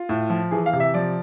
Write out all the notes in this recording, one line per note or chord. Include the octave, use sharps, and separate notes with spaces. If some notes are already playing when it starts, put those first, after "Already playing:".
Already playing: F4
A2
F3
E3 G#4
F5
C3
E5
F3 D5